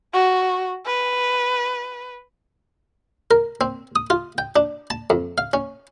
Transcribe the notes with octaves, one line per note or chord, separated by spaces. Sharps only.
F#4
B4
A#4
C4
D#6
F4
G5
D4
A5
F2
F5
C#4